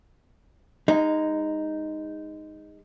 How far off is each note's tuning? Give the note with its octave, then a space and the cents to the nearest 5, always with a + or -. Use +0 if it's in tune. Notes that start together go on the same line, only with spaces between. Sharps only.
G#3 -25 D#4 +0